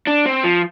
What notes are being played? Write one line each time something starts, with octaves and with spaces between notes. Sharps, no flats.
D4
C4
F3